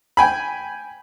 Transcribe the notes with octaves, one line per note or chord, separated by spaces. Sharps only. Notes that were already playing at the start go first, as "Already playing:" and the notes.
G5 G#5 B5